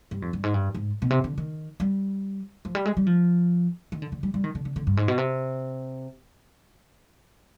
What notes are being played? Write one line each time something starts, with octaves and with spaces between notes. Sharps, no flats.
G2
F2
G2
G#2
G2
G#2
B2
C3
D3
D#3
G3
F3
G3
G#3
G3
F3
D#3
D3
D3
G3
G3
D#3
D3
D3
D3
G2
G#2
B2
C3